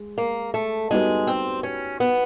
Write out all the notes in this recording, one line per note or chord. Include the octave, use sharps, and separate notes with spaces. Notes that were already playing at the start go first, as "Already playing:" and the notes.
Already playing: G#3
A#3
A3
G3 G#3 B3 D#4 F#4 B4
C4
C#4
B3